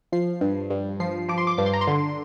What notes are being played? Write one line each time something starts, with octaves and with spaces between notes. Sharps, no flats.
F3 C7
G2
G2
F3 C7
F3 D6
C6
D6
G2 D6
C6
A#5
C6
D3